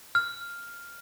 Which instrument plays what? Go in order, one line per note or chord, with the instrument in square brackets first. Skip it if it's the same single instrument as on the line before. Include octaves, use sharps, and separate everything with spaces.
[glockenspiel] F6